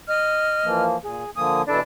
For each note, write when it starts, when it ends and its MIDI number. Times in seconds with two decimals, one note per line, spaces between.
0.08 0.83 75
0.08 0.83 89
0.64 0.97 52
0.64 0.97 53
0.64 0.97 58
1.03 1.24 46
1.03 1.31 68
1.36 1.62 50
1.36 1.62 53
1.36 1.62 58
1.36 1.63 80
1.36 1.63 87
1.67 1.80 47
1.67 1.80 52
1.67 1.80 62
1.67 1.80 64
1.67 1.80 69